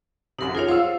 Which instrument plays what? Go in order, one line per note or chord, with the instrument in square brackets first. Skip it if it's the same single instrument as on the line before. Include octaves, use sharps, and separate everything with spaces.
[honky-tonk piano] F#2 C3 [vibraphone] D#4 A#4 F#5
[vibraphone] F4 C#5 [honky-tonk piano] G#4 F7
[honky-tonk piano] F4 E6 [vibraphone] C5